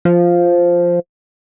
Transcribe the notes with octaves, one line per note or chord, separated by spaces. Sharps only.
F3